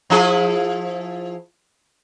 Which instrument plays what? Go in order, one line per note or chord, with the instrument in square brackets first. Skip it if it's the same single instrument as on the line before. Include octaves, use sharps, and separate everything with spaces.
[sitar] F3 E4 G#4